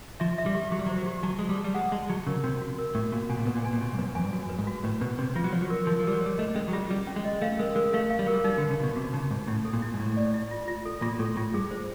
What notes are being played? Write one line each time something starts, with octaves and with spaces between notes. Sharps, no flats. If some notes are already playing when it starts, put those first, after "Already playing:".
F3 E5
E5
G3
G4
F#3 G4
G3
F#3
C5
F#3
G4
F#3 A5
G#3 A5
G3
A5
G3
G#3 F#5
G#3 A5
F#3 A5
C#3 A#4
C3 F#4
F#4
A#4
A2 F#4
A#2 F#4
B2 G#5
A#2
B2 B4
A#2
G#5
A#2
B2 G#5
G2
F#2 B4
F2 G#5
G2
F#2 F#4
B4
G#2
F#4
A2 B4
B2 B4
C3 B4
F3 F4
F#3
F3 C#5
F#3
A#4
F3 A#4
F3
G3 A#4
F#3
G3 C#5
A3 D#5
G#3 C#4
F#3
G3 F4
G3 C#4
C#4
G#3
D#5
A3 F5
G#3 A#4
G#3 A#4
A3 F5
F5
G3
F#3 A#4
G3
G3 D#4
D3
B4
C#3
B2 F#4
C3 F#4
C#3 D#4
G#2 D#4
A2 E4
A4
A#2
E4
G#2
A2 E4
D5
E4
F4
F4
A4
A#2 F4
A2 A4
A2 F4
G2 G#4
C5